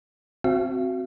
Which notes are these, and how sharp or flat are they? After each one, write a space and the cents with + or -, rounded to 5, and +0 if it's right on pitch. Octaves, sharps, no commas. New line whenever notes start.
C4 +0 F#4 +0 F5 -45